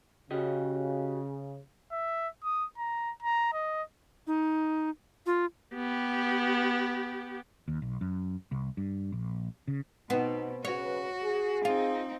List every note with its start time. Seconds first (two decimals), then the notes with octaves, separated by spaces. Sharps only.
0.31 C#3 F#4 G4 D#5
1.92 E5
2.44 D#6
2.78 A#5
3.22 A#5
3.53 D#5
4.27 D#4
5.26 F4
5.74 B3 G4
7.68 D#2
7.82 B1
8.01 F#2
8.52 C2
8.77 G2
9.12 A#1
9.68 C#3
10.10 B2 B3 C4 D#4
10.65 C#3 F#4 B4 C#5
11.23 G#4
11.65 C4 D#4 F4